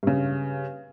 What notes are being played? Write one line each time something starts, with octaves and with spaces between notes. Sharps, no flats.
G2 C#3